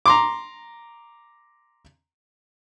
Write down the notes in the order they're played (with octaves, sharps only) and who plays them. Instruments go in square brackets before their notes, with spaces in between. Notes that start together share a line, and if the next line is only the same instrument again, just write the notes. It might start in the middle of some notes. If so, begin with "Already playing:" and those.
[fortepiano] A#5 C6 D6